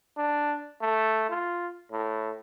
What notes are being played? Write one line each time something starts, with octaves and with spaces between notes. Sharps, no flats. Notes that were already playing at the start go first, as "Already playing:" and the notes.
D4
A3
F4
A2